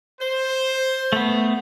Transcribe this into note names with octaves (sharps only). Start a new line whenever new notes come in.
C5
A3 B3